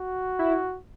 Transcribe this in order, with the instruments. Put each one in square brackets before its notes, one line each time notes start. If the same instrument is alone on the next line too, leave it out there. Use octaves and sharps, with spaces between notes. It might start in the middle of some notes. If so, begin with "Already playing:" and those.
Already playing: [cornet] F#4
[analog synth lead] E4